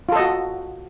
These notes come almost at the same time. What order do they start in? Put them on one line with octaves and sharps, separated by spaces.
F4 A4 D#5 F#4